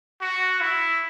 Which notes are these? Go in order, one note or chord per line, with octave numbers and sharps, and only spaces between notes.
F#4
E4